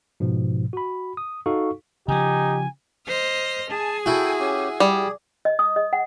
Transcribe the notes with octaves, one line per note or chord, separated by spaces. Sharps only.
G#2 B2 F3
F#4 B5
D#6
D#4 F#4 A4 F5 C#6
C#3 F3 D#4 G4 G#5
C5 D#5 F6
G#4 G#5 A5
E4 F#4 A4 G5
C#4 G4
G3 G#4
D#5
D#6
D#5
F#5